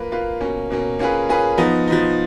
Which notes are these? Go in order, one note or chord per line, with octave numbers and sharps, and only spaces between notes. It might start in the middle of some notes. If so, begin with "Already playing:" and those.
Already playing: A#3 F4 B4
A#3 F4 B4
B2 A#3 C#4
B2 A#3 C#4
A#3 C#4 F4 G#4 B4
A#3 C#4 F4 G#4 B4
F3 B3 D#4
F3 B3 D#4